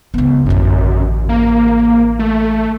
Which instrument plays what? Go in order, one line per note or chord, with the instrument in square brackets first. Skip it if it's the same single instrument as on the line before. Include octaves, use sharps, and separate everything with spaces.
[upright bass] C#2 B3
[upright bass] A1 D3 [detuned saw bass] F#2
[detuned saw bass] A#3
A3